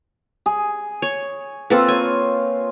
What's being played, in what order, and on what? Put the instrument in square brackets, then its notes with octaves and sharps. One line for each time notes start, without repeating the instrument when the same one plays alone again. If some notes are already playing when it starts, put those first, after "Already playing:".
[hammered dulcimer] G#4
[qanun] C#5
[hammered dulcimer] A#3 F4 [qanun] C4 A4 B4
[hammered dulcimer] C#5 [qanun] G#5